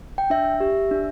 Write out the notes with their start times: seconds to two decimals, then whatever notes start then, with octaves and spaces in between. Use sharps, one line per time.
0.18 G5
0.30 D4 E5
0.60 G4
0.91 D4